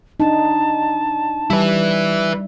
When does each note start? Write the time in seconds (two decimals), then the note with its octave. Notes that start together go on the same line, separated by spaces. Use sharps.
0.20 D4 D#4 A5
1.50 G3 E4 B4 E5